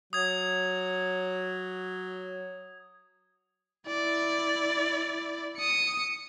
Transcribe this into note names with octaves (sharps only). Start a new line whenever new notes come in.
F#3 D#6 G#6
E4 D5
D#6 C#7